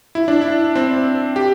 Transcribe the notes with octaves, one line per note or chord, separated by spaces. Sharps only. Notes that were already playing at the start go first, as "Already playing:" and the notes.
E4
D4
E4
C4
G4